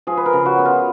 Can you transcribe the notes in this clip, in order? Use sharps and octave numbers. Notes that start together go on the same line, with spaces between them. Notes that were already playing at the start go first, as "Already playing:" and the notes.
F3 G#4
B4
A#4
C#3
F#4
B3
F4